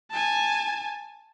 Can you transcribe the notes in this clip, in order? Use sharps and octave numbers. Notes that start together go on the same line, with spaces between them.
G#5 A5